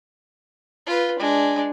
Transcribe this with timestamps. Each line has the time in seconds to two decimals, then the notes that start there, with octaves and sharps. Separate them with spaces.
0.87 F4 B4
1.19 G#3 D4